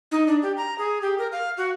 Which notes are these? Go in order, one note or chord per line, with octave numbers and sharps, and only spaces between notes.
D#4
D4
G4
A#5
G#4
G4
A#4
F5
F#4